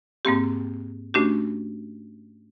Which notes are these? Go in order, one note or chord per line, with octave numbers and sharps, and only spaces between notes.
G#2 A#3 C4 G4
A3 C#4 D4 F#4 G4